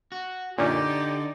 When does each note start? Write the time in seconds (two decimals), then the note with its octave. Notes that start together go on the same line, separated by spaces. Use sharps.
0.12 F#4
0.58 F#2 A#2 D3 D#4 G4 D5